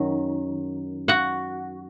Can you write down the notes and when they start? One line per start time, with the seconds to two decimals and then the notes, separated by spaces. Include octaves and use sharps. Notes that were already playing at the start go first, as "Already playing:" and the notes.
Already playing: F#2 D#3 F#3
1.08 F#4 F#5